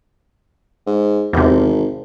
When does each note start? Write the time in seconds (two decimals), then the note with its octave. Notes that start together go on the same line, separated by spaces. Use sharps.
0.87 G#2
1.33 G#1 E2 C3